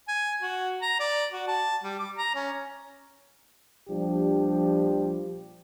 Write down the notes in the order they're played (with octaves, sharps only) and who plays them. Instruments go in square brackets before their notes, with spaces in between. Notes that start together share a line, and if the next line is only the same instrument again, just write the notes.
[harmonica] G#5
F#4
A#5
D5
F#4
A5
G3
D6
A#5
C#4
[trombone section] A#1 F3 G3 D4 G4